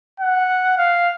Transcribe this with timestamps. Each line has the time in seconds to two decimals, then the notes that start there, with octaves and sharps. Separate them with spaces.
0.20 F#5
0.78 F5